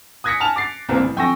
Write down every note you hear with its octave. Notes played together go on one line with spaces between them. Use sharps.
D#6 F#6 G#6 A#6 B6 C#7
G#5 A5 F6 F7
D6 A6 C7
C2 A#3 C4
A1
F2 G5 G#5 C#6 E6 A#6